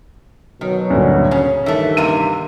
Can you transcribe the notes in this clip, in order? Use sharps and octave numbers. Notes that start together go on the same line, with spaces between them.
B2 D#3 F#3
D2 G2 A#2
C#3 C#4
G2 D#3 E3 A3
C3 E3 A#3 D#7